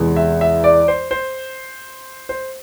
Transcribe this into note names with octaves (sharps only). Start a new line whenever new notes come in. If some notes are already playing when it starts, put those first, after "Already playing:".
Already playing: E2 C3 E3 G#3 B3
E5
E5
D5
C5
C5
C5